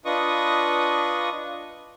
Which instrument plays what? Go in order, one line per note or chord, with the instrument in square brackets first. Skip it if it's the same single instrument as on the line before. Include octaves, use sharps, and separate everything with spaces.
[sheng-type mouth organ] D4 F4 B4 D#5 C#6 D#6